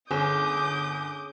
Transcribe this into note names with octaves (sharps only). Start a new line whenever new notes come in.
G1 C#4 G#4 D6 D#6 G6